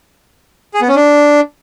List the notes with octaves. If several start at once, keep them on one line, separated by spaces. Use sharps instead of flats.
G#4
B3
C#4
D4